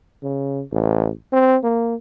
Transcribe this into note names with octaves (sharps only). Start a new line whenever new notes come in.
C#3
A1
C4
A#3